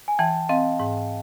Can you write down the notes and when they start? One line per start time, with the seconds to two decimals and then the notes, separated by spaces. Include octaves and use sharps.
0.08 G#5
0.19 E3 G5 A5
0.49 C4 D#5 F5
0.80 G#2